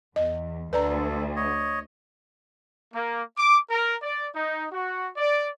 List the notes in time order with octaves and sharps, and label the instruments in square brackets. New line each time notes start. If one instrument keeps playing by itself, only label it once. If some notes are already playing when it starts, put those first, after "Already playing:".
[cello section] E2 [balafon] D#5
[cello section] D2 [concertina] A4 [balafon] B4 D5 A#5
[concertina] C#5 D#5
[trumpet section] A#3
D6
A#4
D5
D#4
F#4
D5